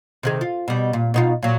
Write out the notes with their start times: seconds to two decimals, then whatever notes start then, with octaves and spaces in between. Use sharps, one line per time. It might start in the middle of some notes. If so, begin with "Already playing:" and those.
0.23 C3 D#3 G#4
0.41 F4
0.68 B2 G3
0.93 A#2
1.14 B2 D#4 F4
1.43 A#2 F#3